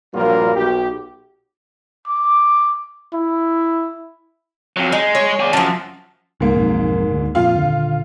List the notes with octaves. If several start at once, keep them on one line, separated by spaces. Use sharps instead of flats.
A#1 G2 F#3 A#3 F4 A#4
B1 G4
D6
E4
F2 F#3
G#3 D#4
C#5
G#4 D5
F#2 F3 A5
C#2 G#2 A#3
B1 F2
D2
F2 A#2 F4 F5
D#1 D3